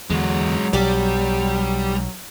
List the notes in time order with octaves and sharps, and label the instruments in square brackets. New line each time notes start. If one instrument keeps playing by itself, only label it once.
[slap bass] E2 D3 [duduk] F#3 [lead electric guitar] G#3 F#4
[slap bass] B1 [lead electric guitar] G3 [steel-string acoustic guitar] G4 D5